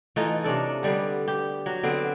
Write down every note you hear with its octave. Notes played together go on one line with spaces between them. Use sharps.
E3 A3 D#4 F4
C3 C#4 D4 A4
D3 G3 B3
G4
F#3
D3 B3 C4